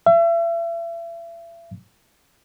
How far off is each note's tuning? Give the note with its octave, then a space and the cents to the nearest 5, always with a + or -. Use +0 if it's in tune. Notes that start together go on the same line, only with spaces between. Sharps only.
E5 +40